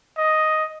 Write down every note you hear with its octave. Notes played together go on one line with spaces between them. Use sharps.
D#5